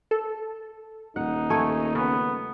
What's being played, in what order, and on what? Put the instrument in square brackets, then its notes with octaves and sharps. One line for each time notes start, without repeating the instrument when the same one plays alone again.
[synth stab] A4
[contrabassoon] D#1 [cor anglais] D#4 [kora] F#5
[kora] A3 [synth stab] G#5 C#6
[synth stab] C#3 [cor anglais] B3